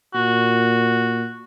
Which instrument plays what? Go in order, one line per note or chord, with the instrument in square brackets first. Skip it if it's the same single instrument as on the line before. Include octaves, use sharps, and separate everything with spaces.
[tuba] A#2 [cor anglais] F#4